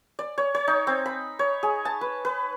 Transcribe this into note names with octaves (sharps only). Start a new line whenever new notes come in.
D5
C#5
C#5
D#4
C4
B5
C#5
G#4
A5
B4
B4